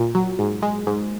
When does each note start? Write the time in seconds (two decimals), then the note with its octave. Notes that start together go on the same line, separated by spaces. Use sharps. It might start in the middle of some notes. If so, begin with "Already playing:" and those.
Already playing: A#2
0.15 F#3
0.39 G#2
0.62 G#3
0.87 G#2